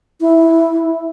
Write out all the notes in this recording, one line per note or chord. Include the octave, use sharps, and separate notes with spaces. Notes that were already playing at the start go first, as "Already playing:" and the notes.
E4